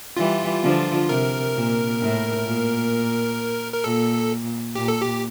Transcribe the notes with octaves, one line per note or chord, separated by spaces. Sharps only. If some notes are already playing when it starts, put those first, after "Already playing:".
E3 G3 F4
D3 F3
C3 A#4
A#2
A2
A#2
A#4
A#2 A4
A#2 G4
A4
G4